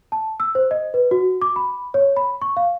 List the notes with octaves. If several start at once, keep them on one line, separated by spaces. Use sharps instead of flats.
A5
E6
C5
D#5
B4
F#4
D6
B5
C#5
B5
C#6
F5